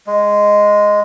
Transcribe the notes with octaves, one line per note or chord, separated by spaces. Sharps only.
G#3